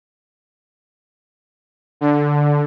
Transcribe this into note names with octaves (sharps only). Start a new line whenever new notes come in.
D3